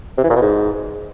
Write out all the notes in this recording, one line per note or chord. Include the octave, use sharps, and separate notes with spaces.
C3
E3
A#2
B2
G#2